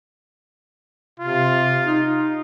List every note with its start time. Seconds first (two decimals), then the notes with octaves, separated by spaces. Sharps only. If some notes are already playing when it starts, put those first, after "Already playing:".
1.20 C3 F4
1.86 D#4